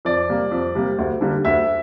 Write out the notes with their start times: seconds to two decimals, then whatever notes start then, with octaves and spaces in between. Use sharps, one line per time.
0.05 F2 D5
0.29 C3 G3 A#3
0.51 F2
0.75 C3 G3 A#3
0.99 D2
1.21 D3 G3 A#3
1.45 D2 E5